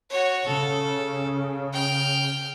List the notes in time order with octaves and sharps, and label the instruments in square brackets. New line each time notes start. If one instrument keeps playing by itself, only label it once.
[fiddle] F#4 C#5
[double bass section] C#3 [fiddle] A4
[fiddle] G5 F6